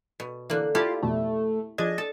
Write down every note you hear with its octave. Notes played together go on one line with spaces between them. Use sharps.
B2
D3 E3 A#3 F#6
E4 F4 G4 A4 D5
A1 F2 B2 A3
F3 D4 G#4 D#5 G#6
A4 A6